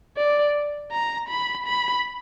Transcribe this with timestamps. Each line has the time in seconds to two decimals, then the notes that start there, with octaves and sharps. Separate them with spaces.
0.17 D5
0.92 A#5
1.29 B5
1.66 B5